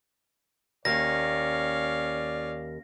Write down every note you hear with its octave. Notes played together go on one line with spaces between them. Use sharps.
D#2 C#4 D5 F5 A#6